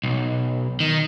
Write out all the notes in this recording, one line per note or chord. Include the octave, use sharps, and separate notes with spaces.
B1
D#3